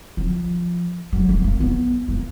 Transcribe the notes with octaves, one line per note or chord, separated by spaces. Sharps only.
F3
F#3
A3
A#3
B3
A#3